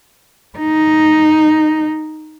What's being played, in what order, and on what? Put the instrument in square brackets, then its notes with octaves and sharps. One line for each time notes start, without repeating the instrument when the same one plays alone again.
[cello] D#4